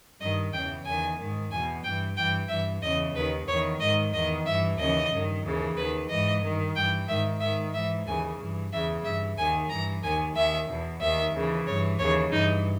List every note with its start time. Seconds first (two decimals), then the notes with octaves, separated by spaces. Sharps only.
0.20 G2 D#3 D#5
0.52 E2 C#3 E3 G5
0.85 E2 D#3 G#5
1.18 G#2 D#3
1.50 E2 B2 G#5
1.83 G2 E3 G5
2.16 G2 E3 G5
2.48 G2 E3 E5
2.82 E2 C#3 E3 D#5
3.14 D#2 D#3 B4
3.47 E2 D#3 C#5
3.80 G#2 D#3 D#5
4.13 E2 D#3 D#5
4.45 G2 E3 E5
4.78 D#2 C#3 E3 D#5
5.11 G2 D#3
5.44 D#2 C#3 E3
5.76 D#2 D#3 B4
6.09 G#2 E3 D#5
6.42 G2 D#3
6.75 G2 E3 G5
7.08 G#2 D#3 E5
7.40 G#2 D#3 E5
7.73 G#2 E3 E5
8.06 D#2 C#3 E3 G#5
8.39 G2 E3
8.71 E2 C#3 E3 E5
9.04 G2 E3 E5
9.37 D#2 D#3 G#5
9.69 G2 E3 A#5
10.02 D#2 D#3 G#5
10.35 D#2 D#3 E5
10.68 E2 B2
11.00 D#2 D#3 E5
11.34 D#2 C#3 E3
11.67 G2 E3 C#5
11.99 D#2 C#3 E3 C#5
12.32 G2 E3 D#4